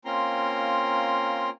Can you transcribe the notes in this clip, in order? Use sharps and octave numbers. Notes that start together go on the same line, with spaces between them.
A#3 C4 C#4 F4 A#5 C6